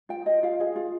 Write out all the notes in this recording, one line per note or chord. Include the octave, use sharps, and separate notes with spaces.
F4 G5
F4 D#5
F4 F5
G#4 D#5
F4